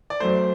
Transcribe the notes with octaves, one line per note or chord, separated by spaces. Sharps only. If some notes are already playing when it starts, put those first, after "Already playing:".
D5
F#2 F#3 A3 C5